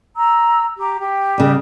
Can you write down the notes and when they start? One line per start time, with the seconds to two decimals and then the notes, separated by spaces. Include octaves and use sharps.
0.16 A#5 E6
0.79 G4 A#5 D6
1.01 G4 G5
1.38 C#3 G3